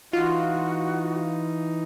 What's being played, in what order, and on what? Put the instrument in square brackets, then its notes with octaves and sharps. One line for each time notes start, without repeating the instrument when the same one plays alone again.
[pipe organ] E3 D#4 [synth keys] F4 [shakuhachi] F#4